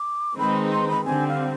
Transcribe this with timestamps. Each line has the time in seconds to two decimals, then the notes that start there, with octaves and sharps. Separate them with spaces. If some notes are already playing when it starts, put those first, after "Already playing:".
Already playing: D6
0.37 D#3 G#3 C4 D#4 B4 B5
0.72 C6
0.89 B5
1.05 D3 G3 C4 G#5
1.28 F5